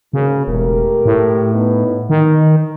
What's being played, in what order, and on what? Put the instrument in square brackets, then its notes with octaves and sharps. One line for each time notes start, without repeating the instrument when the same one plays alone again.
[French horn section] G#2 A#3 F#4 [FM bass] C#3
[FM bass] E1 [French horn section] A3 G4 A#4
[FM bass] A2
[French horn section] B3 D#4
[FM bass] D#3 [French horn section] D#4